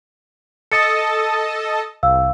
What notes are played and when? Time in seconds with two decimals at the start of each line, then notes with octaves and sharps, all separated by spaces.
0.72 A4 D#5 A5 D#6 A6 C#7
2.03 C2 F5 E6